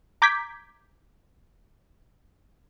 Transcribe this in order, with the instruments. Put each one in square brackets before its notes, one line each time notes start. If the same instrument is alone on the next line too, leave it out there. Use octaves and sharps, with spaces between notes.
[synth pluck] A#5 D6 G6 G#6 B6